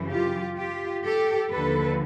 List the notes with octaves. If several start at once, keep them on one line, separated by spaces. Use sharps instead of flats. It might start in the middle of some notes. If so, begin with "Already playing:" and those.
Already playing: F#2 C#3 E3
F4 G4
F4 G4
G4 A4
D#2 D3 F3 A4 B4